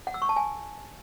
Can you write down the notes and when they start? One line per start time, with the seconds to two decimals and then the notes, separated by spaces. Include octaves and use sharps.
0.07 F#5
0.14 E6
0.22 C#6
0.29 A5
0.36 G#5